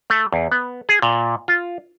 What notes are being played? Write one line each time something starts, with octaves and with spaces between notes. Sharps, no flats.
A3
E2
B3
G#4
A#2
F4